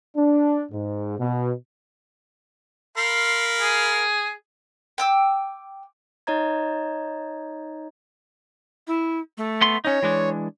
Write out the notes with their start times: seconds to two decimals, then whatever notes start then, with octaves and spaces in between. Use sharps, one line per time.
0.17 D4
0.72 G#2
1.20 B2
2.97 A#4 F5 B5 C6
3.60 G#4
4.98 G5 D6 E6
6.27 D#4 C#5 D#5 A#5 G#6
8.87 E4
9.38 A3
9.62 B3 C6
9.85 C#4 D#4 C#5
10.02 E3 G#3 D4